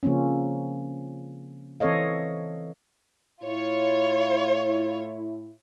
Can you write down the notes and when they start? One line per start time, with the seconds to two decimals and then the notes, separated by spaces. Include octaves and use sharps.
0.03 C#3 F3 A#3 C4 C#4
1.80 E3 C4 A4 C#5 D#5 F5
3.43 A2 E4 F4 C#5